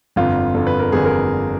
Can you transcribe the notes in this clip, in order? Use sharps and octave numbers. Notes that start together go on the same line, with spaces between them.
G1 F2 D3 F4
G1 F2 D3 A4
B4
A#4
G1 F2 D3 G#4
A#4